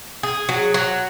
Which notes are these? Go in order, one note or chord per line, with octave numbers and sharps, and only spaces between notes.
G#4
F#3
F#3